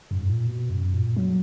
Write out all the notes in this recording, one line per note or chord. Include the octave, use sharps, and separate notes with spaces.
F#2
G#2
A#2
B2
F#2
A#2
F#3